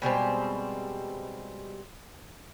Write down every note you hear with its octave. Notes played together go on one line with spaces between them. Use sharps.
B2 G3 G#3 C4